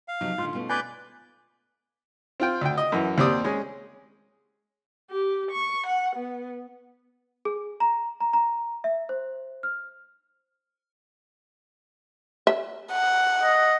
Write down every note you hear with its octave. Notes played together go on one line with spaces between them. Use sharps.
F5
C3 F3 F#3 D#4
A2 D3 F4 C6
B2 A3 C#4
B4 D5 G#5 B5 G6
C4 F4 G5
D2 G5
D#5
F#2 E3
D#2 C4 G4 D5 D#6
G#3 C#4 G#4
G4
C#6
F#5
B3
G#4
A#5
A#5
A#5
E5
C5
F6
E5
F#5
D#5